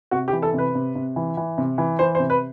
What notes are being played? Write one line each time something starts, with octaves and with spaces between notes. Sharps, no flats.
C3 F#4
G4
E3
A4
C3
B4
C3
C3
E3
E3
C3
E3
E3 C5
C5
C3
B4